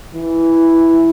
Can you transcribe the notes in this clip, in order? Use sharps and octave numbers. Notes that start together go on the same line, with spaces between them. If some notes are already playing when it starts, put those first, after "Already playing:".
E3